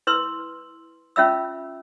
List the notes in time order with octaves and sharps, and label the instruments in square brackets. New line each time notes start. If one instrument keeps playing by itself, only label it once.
[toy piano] E4 B4 C6 E6
C#4 F4 E5 F5 B5 E6